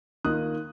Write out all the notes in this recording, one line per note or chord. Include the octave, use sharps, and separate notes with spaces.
D#3 A#3 F4 D#6 F#6